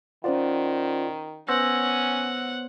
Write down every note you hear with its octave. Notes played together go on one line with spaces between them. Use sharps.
D#3 C#4 F4 C5 D5 F#5
B3 C#4 C5 C#5 F#5 E6 A#6